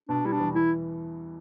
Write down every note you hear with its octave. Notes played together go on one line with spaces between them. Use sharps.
B2 D4
G3 E4
D4
E2
E3 E4